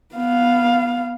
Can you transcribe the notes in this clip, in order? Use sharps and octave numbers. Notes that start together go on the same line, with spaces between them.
B3 F5